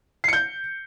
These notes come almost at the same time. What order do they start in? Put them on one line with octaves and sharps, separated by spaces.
C7 C#7 G6